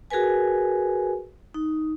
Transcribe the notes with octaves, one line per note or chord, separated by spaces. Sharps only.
F#4 G#4 A#4 B4 G#5
D#4